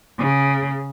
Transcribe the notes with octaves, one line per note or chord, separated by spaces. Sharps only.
C#3